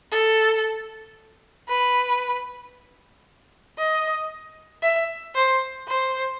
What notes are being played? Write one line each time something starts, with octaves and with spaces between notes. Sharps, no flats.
A4
B4
D#5
E5
C5
C5